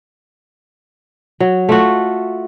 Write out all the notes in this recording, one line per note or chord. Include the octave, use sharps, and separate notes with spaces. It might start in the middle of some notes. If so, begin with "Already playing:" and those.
F#3
A3 F4 F#4